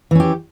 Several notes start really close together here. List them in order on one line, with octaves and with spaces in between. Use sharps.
E3 C#4 G4